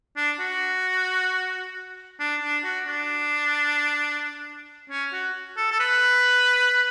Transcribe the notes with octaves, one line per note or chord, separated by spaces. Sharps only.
D4
F#4
D4
D4
F#4
D4
C#4
F#4
A4
A4
B4